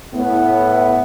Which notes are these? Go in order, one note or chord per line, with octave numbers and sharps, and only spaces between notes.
A2 B3